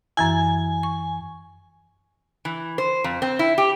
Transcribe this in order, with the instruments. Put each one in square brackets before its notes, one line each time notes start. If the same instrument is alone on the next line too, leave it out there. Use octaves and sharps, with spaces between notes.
[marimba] F#2 E3 E4 [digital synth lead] G#5
[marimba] C#6
[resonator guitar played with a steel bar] E3
C5
F2
C4
E4
G4